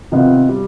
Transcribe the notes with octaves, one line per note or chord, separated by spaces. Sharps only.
C3 D#3 B3 F4
G3